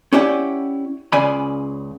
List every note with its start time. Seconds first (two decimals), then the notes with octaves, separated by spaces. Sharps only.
0.13 C#4 E4 G4 D5 F#5 G5
1.12 C#2 C#3 D5 G#5 B5